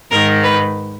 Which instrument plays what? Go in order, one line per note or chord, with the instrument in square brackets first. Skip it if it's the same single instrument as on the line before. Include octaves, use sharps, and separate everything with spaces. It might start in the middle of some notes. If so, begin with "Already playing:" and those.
[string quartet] G#2 D#3 A#4
B4